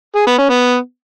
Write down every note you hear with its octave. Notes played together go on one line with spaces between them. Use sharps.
G#4
B3
C#4
B3